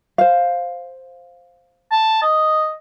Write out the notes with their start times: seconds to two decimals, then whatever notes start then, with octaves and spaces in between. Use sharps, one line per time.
0.18 C5 F5
1.92 A5
2.22 D#5